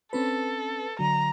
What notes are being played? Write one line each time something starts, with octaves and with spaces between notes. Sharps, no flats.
C4 C#4 A4 B4
D3 F#3 A#5